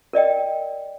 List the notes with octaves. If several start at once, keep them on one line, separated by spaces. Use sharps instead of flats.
A#4 D5 D#5 G5